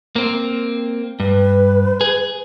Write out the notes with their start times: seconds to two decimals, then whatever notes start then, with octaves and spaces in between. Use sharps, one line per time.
0.16 A#3 C4
1.20 G2 B4
2.01 G#4